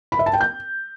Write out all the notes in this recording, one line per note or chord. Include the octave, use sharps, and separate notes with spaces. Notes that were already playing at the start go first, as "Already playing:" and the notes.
B5
E5
A5
G5
G6